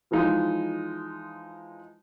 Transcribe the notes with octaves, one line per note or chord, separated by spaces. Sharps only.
E3 F3 G#3 D#4 F4